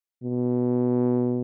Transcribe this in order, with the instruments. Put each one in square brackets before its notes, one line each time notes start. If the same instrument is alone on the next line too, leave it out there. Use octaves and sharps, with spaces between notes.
[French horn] B2